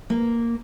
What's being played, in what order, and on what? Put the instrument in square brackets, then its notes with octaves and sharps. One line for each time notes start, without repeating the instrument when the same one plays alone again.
[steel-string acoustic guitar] A#3